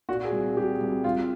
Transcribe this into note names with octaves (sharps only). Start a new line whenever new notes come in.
A#2 F#4
G#4
C2
C2 G4
C2
C2 F4